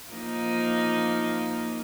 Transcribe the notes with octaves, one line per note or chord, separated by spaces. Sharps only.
F3 A#3 D#4